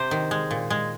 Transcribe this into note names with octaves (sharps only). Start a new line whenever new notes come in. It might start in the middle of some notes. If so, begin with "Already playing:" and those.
Already playing: C3 C5
D#3
G#3
A#2
G#3